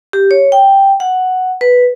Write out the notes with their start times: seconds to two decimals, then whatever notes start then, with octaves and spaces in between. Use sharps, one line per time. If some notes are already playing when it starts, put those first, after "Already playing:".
0.13 G4
0.31 C#5
0.52 G5
1.00 F#5
1.61 B4